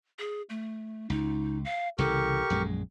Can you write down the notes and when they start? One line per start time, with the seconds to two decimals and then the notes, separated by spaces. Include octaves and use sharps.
0.19 G#4
0.50 A3
1.10 C#2 D#4
1.65 F5
1.98 C2 C#3 E3 G4 A4 A#4 C#6
2.50 A#1 F#2 G#3